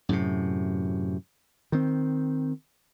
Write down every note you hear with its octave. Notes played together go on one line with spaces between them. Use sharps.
F#2 A2 C3
D#3 C4